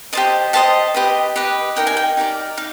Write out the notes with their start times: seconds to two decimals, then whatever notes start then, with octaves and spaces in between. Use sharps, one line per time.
0.13 G4 C5 D#5 A5
0.53 G4 C5 D#5 A5
0.94 G4 B4 D#5
1.36 G4 B4 D#5
1.76 D#4 G4 A#4 D5 G5
1.87 G#5
1.97 G5
2.17 D#4 G4 A#4 D5
2.57 D#4 F5